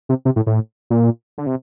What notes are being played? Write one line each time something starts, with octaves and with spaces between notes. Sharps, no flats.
C3
C3
A2
A2
A#2
D3
C3